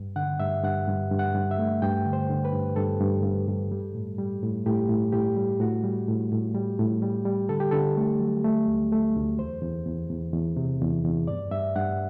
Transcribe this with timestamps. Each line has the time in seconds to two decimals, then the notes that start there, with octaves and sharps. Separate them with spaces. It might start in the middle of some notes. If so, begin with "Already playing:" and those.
Already playing: G2
0.16 D3 F#5
0.40 G2 E5
0.63 G2 F#5
0.88 G2
1.11 G2
1.19 F#5
1.35 G2
1.51 E5
1.59 A3
1.82 G2 G5
2.06 D3
2.13 C5
2.30 D3
2.45 B4
2.53 G2
2.76 G2 A4
3.01 G2
3.23 G2
3.48 G2
3.71 G3
3.95 A2
4.18 G3
4.42 A2
4.66 A2 G4
4.89 A2
5.13 A2 G4
5.37 G3
5.60 A2 F#4
5.84 G3
6.08 A2
6.32 A2
6.54 G3
6.79 A2
7.02 G3
7.26 G3
7.49 D3 A4
7.60 G4
7.71 D3 A4
7.97 A3
8.20 F#3
8.45 A3
8.67 D2
8.92 A3
9.16 D2
9.39 E2 C5
9.62 E2
9.87 E2
10.10 E2
10.33 E2
10.57 C3
10.81 E2
11.04 E2
11.27 G2 D5
11.51 G2 E5
11.75 G2 F#5